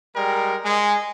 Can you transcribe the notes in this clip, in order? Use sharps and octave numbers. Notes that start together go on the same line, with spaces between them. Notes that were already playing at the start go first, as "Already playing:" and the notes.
G3 G#3 A#4
G#3